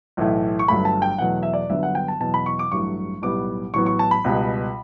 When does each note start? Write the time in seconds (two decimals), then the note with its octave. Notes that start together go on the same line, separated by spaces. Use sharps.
0.17 B1 A2 E3 A3
0.59 C#6
0.68 G1 G2 F#3 A3 B5
0.85 A5
1.02 G5
1.19 E2 B2 F#3 A3 F#5
1.43 E5
1.53 D5
1.70 G1 G2 D3 F#3 B3 E5
1.83 F#5
1.95 G5
2.08 A5
2.20 E2 B2 F#3 A5
2.34 B5
2.46 C#6
2.59 D6
2.72 A1 G2 F#3 A3 C#6
3.22 B1 A2 G3 B3 D6
3.74 A1 A2 F#3 B3 C#6
3.86 C#6
3.99 A5
4.11 B5
4.24 C#2 B2 G3 B3